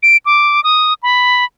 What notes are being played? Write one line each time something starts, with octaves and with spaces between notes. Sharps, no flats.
D7
D6
D#6
B5